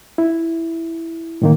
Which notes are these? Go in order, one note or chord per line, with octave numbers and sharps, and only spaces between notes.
E4
A2 D#3 A#3